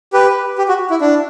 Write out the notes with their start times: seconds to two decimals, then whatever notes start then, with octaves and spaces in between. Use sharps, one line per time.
0.13 G4 B4
0.58 G4
0.69 F#4
0.90 E4
1.01 D4